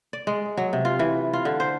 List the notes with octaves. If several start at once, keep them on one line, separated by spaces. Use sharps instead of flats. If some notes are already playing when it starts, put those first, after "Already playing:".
D5
G#3
F#3
C3
F4
E3
F4
D3
C5